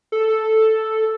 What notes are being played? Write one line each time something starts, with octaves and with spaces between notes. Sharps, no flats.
A4